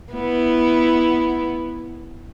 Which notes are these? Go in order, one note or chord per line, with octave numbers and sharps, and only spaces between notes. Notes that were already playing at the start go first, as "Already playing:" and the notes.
B3 E4